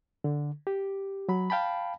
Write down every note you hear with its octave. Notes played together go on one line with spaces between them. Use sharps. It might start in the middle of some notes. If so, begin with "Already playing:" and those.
D3
G4
F#3 B5
F5 G5 A5 B5